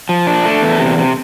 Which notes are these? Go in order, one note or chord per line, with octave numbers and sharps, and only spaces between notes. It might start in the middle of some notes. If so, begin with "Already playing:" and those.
F3
D4
A3
E2
C3
C3